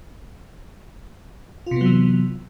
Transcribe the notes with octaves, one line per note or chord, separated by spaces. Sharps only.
C3 E3 F#3 B3 F4